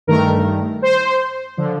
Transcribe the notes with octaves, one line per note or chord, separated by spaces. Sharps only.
G2 D#3 A3 A#4
C5
D3 F3